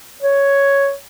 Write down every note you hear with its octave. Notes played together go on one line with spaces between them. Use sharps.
C#5